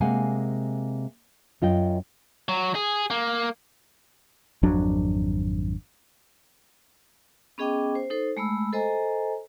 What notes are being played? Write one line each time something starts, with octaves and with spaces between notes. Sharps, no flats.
C3 G#3 A#3 F5 F#5 G#5
F#2 F4 D#5 G5
F#3
G#4
A#3
G#1 F2 F#3 D4
B3 C#4 G#4 D#5 G5 D6
C5
D#4 A4 C5
G#3 A3 B5 E6
A4 C5 D#5 G#5 A#5